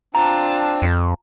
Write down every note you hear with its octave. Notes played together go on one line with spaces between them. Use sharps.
C4 D4 F4 A5 A#5
F2